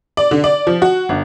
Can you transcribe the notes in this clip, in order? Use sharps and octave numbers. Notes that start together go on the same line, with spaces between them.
D5
D3
D5
F3
F#4
G1